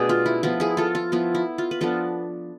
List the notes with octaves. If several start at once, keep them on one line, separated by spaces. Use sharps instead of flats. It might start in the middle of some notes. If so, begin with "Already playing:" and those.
Already playing: B2 A3 D4 G#4
F4
E4
F3 B3 E4 F4
E4 G#4
F4 A4
F4
F3 B3 E4 F4
E4
F4
B4
F3 B3 D4 F4 A4